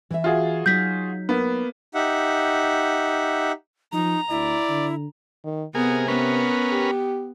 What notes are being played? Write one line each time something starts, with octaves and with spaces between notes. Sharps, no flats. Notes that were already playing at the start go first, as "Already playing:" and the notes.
E3 E5
F4 F#4 G#4
F#3 D#4 G6 B6
A#3 B3
D#4 G4 E5 F#5
F3 D#4 A#5
D2 E4 D5
D3
D#3
C3 B3 G#4 A#4
B3 C#4 A#4 B4
G4